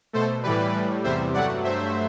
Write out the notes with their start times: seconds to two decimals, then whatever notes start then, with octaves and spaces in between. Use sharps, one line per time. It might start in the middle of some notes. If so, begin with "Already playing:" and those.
0.13 B2 A3 A4 C5
0.43 A2 E3 G3 B4 D5
0.74 A2 G3
1.04 E2 C3 G3 C5 E5
1.34 G2 F#3 A3 D5 F#5
1.64 G2 F#3 A3 C5 E5